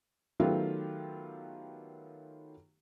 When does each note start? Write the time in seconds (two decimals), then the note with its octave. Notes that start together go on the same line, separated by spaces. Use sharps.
0.40 D#3 F#3 A3 B3 F4 G4